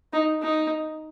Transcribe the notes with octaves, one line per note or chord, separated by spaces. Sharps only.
D#4
D#4